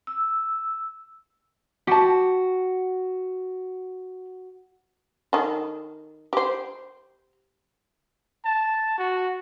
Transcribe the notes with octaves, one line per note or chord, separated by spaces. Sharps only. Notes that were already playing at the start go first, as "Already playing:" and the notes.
E6
F#4 G4 A5
D#3 A4
G4 C5
A5
F#4